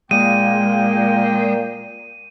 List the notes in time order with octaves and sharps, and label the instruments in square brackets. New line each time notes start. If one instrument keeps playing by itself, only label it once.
[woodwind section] A#2 A#3 G5 [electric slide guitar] G#3 [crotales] D#7